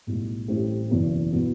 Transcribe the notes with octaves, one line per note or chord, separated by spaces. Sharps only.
B1 A2 G3
A1 A2 G3 C4 G4
F#1 E2 B2
B2 F#3 B3 E4